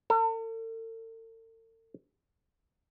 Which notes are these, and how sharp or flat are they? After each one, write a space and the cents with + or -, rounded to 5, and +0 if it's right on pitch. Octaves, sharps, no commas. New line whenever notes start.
A4 +45